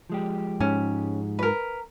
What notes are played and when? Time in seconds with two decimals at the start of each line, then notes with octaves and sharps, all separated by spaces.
0.10 F3 G#3 G4
0.60 G#2 C#4
1.39 A#4 B4